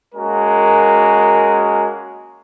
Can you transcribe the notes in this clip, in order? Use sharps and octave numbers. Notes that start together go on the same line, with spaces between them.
G#3 A#3 C#4 F#4 A#4